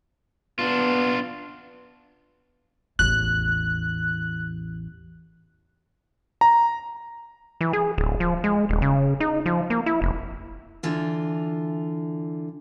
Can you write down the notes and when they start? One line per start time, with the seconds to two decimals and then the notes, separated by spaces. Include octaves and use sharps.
0.59 B3 D4 F4
2.99 A1 E2 F#6
6.41 A#5
7.61 E3
7.73 G#4
7.98 D1
8.20 F3
8.44 G#3
8.69 D#1
8.82 C#3
9.20 D#4
9.46 F3
9.70 A#3
9.86 E4
10.02 F1
10.83 D3 E3 F4